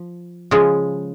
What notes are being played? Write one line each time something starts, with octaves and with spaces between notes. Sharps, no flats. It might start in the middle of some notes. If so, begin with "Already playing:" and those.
Already playing: F3
C#3 F3 G#3